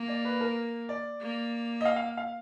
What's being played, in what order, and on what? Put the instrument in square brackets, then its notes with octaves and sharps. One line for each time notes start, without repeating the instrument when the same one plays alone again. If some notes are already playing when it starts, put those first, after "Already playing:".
Already playing: [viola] A#3
[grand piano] D5
B4
A#4
D5
[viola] A#3
[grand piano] D#5
F5
F5
F5